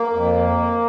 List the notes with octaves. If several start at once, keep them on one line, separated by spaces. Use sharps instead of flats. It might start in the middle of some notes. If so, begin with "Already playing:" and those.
Already playing: A#3
F2